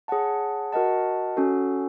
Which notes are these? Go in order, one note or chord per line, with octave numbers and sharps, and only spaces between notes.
G#4 C#5 F#5 A5
F#4 A#4 D#5 F#5 A5
C#4 F#4 A4